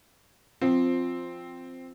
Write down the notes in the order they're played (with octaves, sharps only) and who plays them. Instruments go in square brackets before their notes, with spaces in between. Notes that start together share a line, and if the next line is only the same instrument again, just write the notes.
[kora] F3 [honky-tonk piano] C4